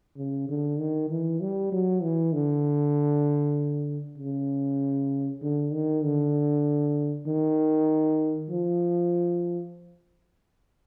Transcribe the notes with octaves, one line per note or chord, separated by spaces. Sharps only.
C#3
D3
D#3
E3
G3
F#3
E3
D3
C#3
D3
D#3
D3
D#3
F3